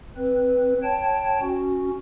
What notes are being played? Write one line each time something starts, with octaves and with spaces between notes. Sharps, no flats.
C4 B4
C#5 G5 A5
C#4 F#4